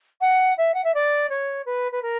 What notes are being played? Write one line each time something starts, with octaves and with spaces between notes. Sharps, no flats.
F#5
E5
F#5
E5
D5
C#5
B4
B4
A#4